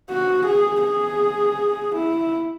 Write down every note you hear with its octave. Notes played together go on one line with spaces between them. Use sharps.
F#4
G#4
G#4
E4